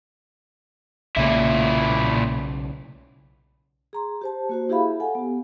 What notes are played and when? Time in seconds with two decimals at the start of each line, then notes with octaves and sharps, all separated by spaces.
1.17 B1 A#2 C#3 E4
3.93 G#4 A#5 C6
4.21 G4 C5 A5
4.49 A#3 F#4 C5
4.69 E4 G4 G#4 E5 F5 B5
5.00 A4 F#5 G#5
5.15 B3 G4